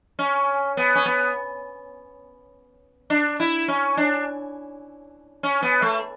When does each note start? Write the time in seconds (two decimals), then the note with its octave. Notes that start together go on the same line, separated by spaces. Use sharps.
0.19 C#4
0.77 B3
0.95 C#4
1.06 B3
3.10 D4
3.40 E4
3.68 C#4
3.97 D4
5.43 C#4
5.62 B3
5.82 A3